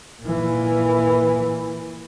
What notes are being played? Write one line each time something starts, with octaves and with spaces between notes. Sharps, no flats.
A#2 E3